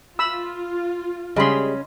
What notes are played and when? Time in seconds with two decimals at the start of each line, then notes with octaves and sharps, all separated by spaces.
0.19 F4 B5 E6
1.36 C#3 G3 G#3 C#4 G#4 D#5 B5 C6